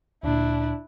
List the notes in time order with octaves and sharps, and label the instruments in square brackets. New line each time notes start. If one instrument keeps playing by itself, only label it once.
[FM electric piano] D2 A#2 [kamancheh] D4 E4